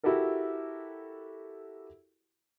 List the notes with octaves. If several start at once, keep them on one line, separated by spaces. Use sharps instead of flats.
E4 F#4 G4 A4 A#4